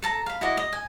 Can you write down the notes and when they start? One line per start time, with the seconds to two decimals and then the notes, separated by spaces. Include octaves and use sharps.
0.02 A4 A5 A#5
0.26 F5 B5
0.41 E4 F#4 D5 D#5
0.57 D#5
0.73 G#5